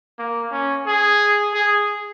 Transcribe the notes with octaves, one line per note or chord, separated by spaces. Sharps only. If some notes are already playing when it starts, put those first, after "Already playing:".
A#3
C#4
G#4
G#4